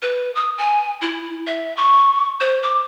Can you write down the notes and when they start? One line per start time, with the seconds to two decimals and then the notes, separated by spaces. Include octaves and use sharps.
0.02 B4
0.35 D#6
0.58 G#5
1.01 E4
1.47 E5
1.77 C#6
2.41 C5
2.63 D6